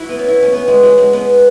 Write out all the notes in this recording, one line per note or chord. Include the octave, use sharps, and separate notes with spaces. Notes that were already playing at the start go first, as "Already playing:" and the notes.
Already playing: E4 F#4
B3
C#4
E4
C#4
B3
G#3
F#3
G#3
B3